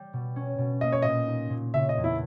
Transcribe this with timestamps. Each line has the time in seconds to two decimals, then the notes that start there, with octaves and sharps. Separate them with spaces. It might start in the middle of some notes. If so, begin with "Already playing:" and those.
Already playing: G3
0.13 B2
0.36 C#4
0.58 B2
0.81 A#3 D#5
0.92 C#5
1.02 A#2 D#5
1.27 D#4
1.50 A#2
1.73 C#3 E5
1.89 D#5
1.97 E2
2.04 E4